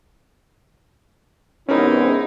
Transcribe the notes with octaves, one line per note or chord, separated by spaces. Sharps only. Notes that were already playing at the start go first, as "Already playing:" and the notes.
E2 G#2 C3 C#4 D#4 E4 A#4